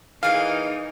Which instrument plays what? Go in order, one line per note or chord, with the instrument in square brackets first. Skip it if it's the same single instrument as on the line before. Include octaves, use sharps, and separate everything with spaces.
[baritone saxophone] E3 [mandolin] A#3 G#4 F#5 [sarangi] D#4 [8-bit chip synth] F5